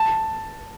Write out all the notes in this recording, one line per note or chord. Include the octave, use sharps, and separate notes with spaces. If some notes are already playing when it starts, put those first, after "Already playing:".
Already playing: A5